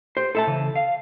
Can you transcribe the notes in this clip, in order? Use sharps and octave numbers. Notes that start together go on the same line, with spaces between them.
G4 C5
E4 A4 E5 A5
C#3 E3
F5